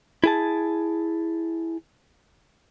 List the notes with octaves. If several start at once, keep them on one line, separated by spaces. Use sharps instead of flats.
E4 G#4 A5